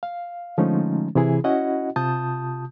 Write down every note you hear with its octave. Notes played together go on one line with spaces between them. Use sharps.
F5
D3 F3 G#3 A3 C#4 D#4
C3 E3 E4 G#4
C#4 E4 F#4 D#5 F#5
C3 F4 A5 D#6 G6